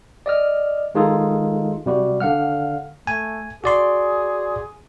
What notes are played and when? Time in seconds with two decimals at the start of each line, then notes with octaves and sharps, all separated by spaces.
0.26 D5 D#5 F6
0.95 D#3 G#3 D#4 F4 G#4 A4
1.86 C3 G3 F#4
2.20 D3 F5 F#5 F6
3.07 A3 G#5
3.64 F#4 G#4 D5 C6